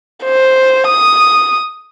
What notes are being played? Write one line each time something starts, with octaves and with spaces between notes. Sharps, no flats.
C5
D#6